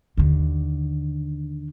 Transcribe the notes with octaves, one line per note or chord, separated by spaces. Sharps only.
D#2 D3